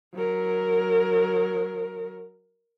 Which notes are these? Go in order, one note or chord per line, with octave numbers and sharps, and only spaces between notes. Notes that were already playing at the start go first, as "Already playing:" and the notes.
F#3 A#4